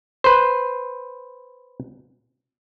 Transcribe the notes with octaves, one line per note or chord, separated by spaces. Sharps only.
B4 C5